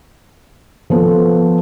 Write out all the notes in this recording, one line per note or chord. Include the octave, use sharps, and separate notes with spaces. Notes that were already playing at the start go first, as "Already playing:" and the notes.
F3 B3 A4